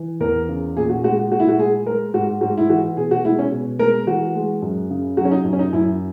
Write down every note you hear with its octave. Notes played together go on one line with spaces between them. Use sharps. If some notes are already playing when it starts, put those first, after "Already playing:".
Already playing: E3
E2 A#4
C#3
A#2 G#4
F#4
G#3 F#4
A#2 F#4
E4
F#4
G#3 G#4
G#3 A#4
G#2 F#4
G#2 F#4
E4
E3 F#4
B2 G#4
F#4
G#3 E4
C#4
B2
G#3 A#4
E3 F#4
G#3
F#2
C#3
F#3 F#4
C#4
D#4
F#2
C#4
D#4
F#2 E4